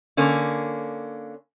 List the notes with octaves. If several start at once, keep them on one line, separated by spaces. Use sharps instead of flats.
D3 A#3 C#4